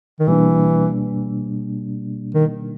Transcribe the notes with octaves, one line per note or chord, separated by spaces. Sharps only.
D#3
B2 E3 G3 A#3 D4
D#3